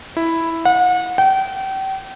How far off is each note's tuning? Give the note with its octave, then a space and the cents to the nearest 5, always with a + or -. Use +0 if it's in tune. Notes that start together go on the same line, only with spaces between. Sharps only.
E4 +0
F#5 -35
G5 -35